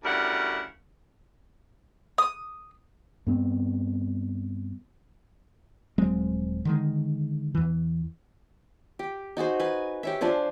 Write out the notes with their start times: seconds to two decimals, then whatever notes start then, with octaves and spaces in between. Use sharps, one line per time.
0.04 D2 C#3 G3 E4 A#4 F#5
2.18 D#6
3.27 G2 B3 C4
5.98 D#1 F#3 G#3 C4
6.65 D3 D#3 G#3
7.55 E2 E3
8.99 G4
9.37 D#4 F#4 G#4 C5
9.60 B4 G#5
10.03 G4 C#5 E5
10.21 F3 D4 G#4 C5